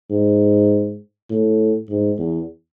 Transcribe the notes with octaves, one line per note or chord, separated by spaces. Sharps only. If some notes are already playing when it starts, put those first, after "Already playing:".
G#2
A2
G#2
E2